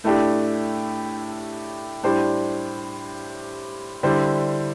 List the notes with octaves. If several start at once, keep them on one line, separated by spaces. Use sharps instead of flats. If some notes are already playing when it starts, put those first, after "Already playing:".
A2 A3 D4 G4
A2 G3 D4 G4 C5
D3 G3 E4 C5